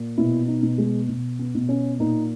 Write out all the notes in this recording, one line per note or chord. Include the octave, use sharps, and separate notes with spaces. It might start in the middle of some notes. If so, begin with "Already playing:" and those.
Already playing: A#2
B2 E4
D#4
B2
G#3
B2
B3
B2
C#4
A#2 D#4